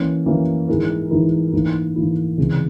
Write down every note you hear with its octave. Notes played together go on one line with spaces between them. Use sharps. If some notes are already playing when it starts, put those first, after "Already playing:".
Already playing: E3 A#3 C#4
E3 A#3 C#4
G#2 E3 G#3 E4 A#4
G#2 E3 G#3 E4 A#4
G#2 E3 A#3 E4
G#2 E3 A#3 E4
C#2 C3 E3 G#3